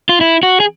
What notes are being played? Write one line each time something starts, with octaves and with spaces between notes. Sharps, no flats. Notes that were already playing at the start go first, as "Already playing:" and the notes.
F4
E4
F#4
G#4